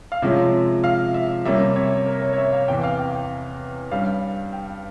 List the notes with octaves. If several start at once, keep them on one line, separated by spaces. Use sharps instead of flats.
F5
C3 F3 G#3 C#4 E5
F5
E5
C3 G3 A#3 C#4 E5
C#5
A#4
C#5
C#5
E5
F5
E2 C3 E3 G5
F5
G5
G5
G2 G3 C#4 F5
G5